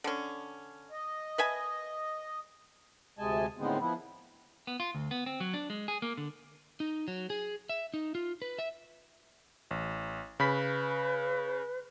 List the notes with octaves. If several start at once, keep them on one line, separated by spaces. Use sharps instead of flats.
D3 C#4
D#5
B4 E5 G#5
D2 C3 G#3 D#5 G#5 A5
A2 D3 D#3 G#3 B3 C4
F3 B3 E4
B3
F4
D2
B3
C4
F#3
D4
G#3
G#4
A#3
D3
D#4
F#3
G#4
E5
D#4
F4
B4
E5
A1
C#3 B4 B5 B6